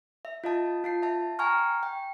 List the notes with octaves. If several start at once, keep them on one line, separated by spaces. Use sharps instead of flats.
E5
F4 D#5 A5
F4 A5 C7
E5 A5
G5 G#5 A#5 C#6 F6
G5